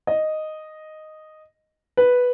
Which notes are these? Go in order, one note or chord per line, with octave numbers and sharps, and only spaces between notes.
D#5
B4